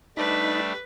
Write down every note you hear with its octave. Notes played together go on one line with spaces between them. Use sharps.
G3 A3 D4 D#4 B4 B5